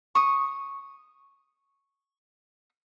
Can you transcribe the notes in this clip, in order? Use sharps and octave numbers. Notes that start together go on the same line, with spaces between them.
C#6 D#6